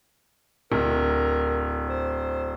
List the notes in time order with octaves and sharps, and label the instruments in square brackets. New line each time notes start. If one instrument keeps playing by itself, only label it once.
[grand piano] D1 [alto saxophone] A#4
[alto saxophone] C5